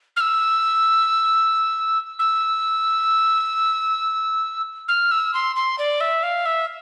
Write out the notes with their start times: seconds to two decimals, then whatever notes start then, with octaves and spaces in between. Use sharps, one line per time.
0.16 F6
0.21 E6
2.19 E6
4.88 F6
5.11 E6
5.34 C6
5.56 C6
5.78 D5
6.01 E5
6.23 F5
6.46 E5